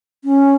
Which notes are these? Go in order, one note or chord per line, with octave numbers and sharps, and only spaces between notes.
C#4